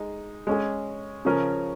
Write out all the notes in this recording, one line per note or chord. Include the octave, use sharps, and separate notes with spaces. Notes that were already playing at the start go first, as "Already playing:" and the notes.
Already playing: G#3 D#4
G#3 C#4 G#4
C#3 F3 C#4 A#4